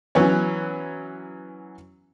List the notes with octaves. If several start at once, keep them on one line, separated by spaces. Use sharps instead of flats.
E3 F#3 B3 C#4 C#5